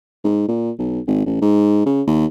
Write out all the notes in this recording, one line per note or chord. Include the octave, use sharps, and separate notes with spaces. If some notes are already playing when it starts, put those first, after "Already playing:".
G#2
A#2
B1
G#1
A1
G#2
C#3
D#2